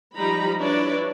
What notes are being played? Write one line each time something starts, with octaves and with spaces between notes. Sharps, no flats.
F3 G3 D#4 A#5 B5
D4 E4 B4 C#5 D5